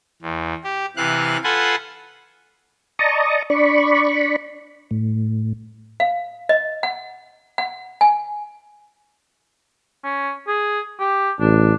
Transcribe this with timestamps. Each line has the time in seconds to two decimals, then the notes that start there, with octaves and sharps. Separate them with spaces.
0.22 E2
0.64 G4
0.97 C3 E3 F5 F#6
1.44 F4 A4 B4 F#5 G#5 C6
2.99 D5 D#5 A5 A#5 C#6 D#6
3.50 D4 D5 B5 C#6
4.91 A2
6.00 F5
6.49 D#5
6.83 F#5
7.58 F#5
8.01 G#5
10.04 C#4
10.47 G#4
10.99 G4
11.40 A1 D4